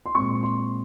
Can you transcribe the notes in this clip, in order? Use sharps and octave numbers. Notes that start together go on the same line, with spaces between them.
C6
A#2 G#3 C4 C#6
C6